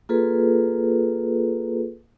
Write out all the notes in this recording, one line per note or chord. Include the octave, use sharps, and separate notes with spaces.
A#3 F4 G#4 A4 B4